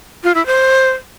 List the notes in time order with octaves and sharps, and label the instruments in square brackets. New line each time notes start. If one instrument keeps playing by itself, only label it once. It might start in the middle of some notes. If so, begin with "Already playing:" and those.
[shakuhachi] F4
E4
C5